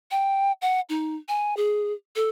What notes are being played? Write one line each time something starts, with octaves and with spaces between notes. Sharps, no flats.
G5
F#5
D#4
G#5
G#4
A4